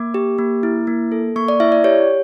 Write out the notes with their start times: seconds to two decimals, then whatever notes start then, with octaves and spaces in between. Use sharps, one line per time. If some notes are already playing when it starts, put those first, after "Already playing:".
Already playing: A#3 D6
0.14 G4
0.38 A#3
0.63 E4
0.87 A#3
1.12 A4
1.36 A#3 C#6
1.48 D5
1.60 E4 E5
1.72 D5
1.84 G4 C#5